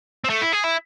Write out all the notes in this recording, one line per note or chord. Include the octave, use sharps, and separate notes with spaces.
C4
A3
E4
G#4
E4